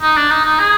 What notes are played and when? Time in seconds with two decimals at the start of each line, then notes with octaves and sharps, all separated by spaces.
0.02 D#4
0.17 D4
0.31 D#4
0.45 D#4
0.60 G#4